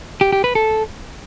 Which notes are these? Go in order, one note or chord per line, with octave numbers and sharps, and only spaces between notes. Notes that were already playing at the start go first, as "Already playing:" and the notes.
G4
G4
B4
A4